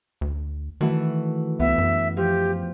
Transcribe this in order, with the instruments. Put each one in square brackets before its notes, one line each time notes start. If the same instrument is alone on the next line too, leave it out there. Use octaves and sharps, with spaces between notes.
[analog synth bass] D2
[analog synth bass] D#3 [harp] E3 A3 F#4
[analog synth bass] C#2 [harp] B3 [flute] E5
[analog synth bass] F#2
[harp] F3 [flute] G4